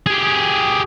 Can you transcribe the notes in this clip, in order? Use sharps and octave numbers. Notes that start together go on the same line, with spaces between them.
G4 G#4